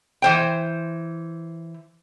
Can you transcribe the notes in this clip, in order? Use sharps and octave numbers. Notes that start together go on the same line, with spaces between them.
E3 C5 G5